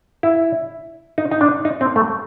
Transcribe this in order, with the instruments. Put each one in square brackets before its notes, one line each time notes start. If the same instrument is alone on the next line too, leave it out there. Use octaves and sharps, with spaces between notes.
[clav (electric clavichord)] E4
D#4
D#4
D4
D#4
C4
A3